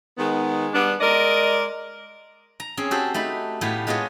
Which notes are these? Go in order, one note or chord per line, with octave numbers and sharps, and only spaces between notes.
D#3 G#3 B3
G3 B3 D4
G#3 A#4 D5 D#5
A#5
C4 C#4 G#4
F#4 G4 A4 C5
A3 D#4 B5
A2 B3 G4 F5 G#5
G#3 B3 F4 C#5 D#5